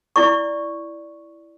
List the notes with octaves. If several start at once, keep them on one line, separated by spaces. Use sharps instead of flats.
E4 D5 C#6